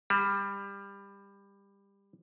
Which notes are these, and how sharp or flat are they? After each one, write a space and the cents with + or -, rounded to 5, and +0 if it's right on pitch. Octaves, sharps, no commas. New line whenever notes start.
G3 +20